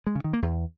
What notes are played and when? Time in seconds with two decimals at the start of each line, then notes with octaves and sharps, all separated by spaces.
0.07 G#3
0.15 C#3
0.24 D#3
0.33 A#3
0.42 E2